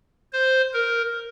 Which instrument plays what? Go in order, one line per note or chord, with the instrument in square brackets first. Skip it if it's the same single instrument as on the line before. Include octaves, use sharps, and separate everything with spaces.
[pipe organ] C5
A#4